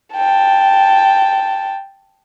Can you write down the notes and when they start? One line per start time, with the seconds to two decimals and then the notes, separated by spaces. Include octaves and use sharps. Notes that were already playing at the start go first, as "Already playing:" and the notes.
0.15 G5 A5